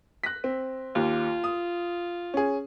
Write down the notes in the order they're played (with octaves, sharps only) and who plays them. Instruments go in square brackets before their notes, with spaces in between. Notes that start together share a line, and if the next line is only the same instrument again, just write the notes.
[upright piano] F#6 A#6 B6
C4
[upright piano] D#2 [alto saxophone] F4
[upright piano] D#6
C#4 G#4